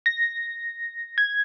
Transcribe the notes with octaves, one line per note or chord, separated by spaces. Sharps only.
A#6
G#6